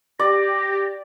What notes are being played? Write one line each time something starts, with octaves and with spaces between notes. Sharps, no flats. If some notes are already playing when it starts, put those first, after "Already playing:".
G4 D5 A#6